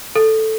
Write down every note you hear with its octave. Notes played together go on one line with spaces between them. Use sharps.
A4